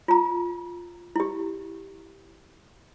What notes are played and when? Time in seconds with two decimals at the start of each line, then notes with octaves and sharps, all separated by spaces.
0.08 F4 A#5
1.16 E4 G4